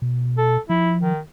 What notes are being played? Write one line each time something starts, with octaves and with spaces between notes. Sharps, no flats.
B2
A4
F3 E4
D#3